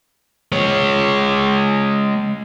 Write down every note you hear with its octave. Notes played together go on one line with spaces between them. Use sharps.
G#3 C#5